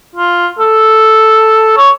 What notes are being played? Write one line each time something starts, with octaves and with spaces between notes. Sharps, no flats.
F4
A4
C#5